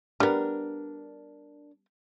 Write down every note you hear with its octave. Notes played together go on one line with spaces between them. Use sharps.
G3 B3 D4 A#4